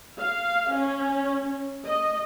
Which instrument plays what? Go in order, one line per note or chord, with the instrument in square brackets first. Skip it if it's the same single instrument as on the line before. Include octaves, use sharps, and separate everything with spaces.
[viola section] F5
C#4
D#5